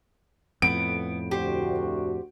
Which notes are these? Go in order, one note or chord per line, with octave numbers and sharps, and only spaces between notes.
F2 A2 B3 D7
D2 F#4 G4 C5